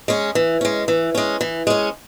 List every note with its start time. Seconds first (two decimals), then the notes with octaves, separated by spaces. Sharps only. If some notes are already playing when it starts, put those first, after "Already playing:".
0.08 G#3 C#4
0.35 E3
0.61 G#3 C#4
0.88 E3
1.15 G#3 C#4
1.41 E3
1.67 G#3 C#4